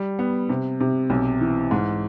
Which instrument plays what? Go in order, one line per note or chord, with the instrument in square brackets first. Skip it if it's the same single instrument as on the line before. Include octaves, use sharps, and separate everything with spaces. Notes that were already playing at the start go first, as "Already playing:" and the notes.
Already playing: [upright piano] G3
B3
C3
C3
B1
E3
G#2